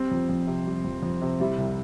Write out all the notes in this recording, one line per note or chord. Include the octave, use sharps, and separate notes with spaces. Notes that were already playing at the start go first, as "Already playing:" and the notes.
Already playing: G3 C4
F2
F2
C3
G3
F2
F2
C3
G3 E4
C2